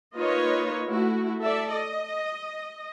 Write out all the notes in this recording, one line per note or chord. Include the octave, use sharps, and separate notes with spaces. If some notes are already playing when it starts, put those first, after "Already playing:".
A#3 D#4 F4 B4 C#5 D#5
A3 E4 F#4
A4 D5 E5
D#5